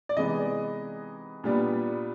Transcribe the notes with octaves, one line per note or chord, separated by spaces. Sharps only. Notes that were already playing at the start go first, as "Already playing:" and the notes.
D5
C3 E3 G#3 B3 D#4 D#5
A#2 G3 B3 D4